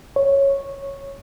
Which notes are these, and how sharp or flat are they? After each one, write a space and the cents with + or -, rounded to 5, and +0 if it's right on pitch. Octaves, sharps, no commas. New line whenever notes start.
C#5 -5